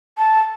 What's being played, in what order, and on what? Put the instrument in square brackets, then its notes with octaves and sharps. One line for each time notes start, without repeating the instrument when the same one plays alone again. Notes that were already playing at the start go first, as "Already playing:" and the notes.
[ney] A5